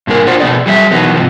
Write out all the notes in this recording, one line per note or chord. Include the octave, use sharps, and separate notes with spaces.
G2 A#2 D3 G#4 A#4
D4 F4 F#4 C5 D5
B2 A3 B3 G#4 D5
F#3 G3 G#4 C5 E5
B2 D#3 E3 F#3 B3
G#2 C3 F3